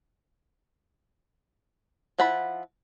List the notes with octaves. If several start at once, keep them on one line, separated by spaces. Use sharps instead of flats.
F3 E4 F#5 A5 B5